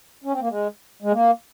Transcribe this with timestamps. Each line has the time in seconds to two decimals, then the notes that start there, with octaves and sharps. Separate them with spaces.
0.24 C#4
0.32 C4
0.40 A#3
0.49 G#3
1.02 G#3
1.12 A#3